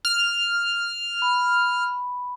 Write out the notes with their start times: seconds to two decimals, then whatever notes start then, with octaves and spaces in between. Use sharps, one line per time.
0.05 F6
1.22 B5